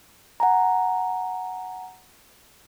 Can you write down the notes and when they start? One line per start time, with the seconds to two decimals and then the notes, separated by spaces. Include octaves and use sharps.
0.40 F#5 G#5 A#5